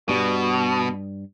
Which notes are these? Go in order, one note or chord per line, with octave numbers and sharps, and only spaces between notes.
G2 B2 G3